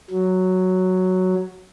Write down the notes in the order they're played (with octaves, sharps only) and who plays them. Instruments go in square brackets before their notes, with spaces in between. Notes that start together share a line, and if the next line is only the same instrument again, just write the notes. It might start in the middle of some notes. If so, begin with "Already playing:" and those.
[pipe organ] F#3